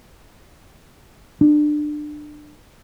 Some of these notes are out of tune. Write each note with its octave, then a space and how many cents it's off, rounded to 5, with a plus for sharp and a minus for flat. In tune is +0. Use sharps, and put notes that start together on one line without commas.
D4 +25